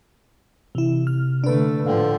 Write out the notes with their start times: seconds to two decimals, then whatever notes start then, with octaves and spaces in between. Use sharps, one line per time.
0.75 C3 E3 E4
1.07 F6
1.44 D3 A3 D4 B4
1.86 A2 D3 F3 F5 G5